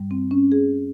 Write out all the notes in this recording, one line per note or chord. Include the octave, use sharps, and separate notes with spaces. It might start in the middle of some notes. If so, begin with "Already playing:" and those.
Already playing: G2 G3
C4
C#4
G#4